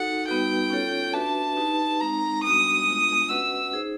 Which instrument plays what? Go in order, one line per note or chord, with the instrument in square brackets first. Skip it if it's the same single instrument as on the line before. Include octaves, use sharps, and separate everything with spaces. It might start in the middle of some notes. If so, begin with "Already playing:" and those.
Already playing: [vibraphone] D#4 F#4 A4 [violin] F#5
[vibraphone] G3 B3 D#4 F#4 B4 [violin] G5
[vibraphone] C#4 F4 A4 C#5
[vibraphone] D4 F#4 B4 E5 [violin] A5
[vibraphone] D#4 G4 B4
[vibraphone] G#3 C4 D#4 [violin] A#5
[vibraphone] G3 B3 D4 F#4 [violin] D#6
[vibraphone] G#3 B3 D4 F4
[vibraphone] C#4 F#4 B4 D#5 F#5 [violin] E6
[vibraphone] D#4 G#4 C5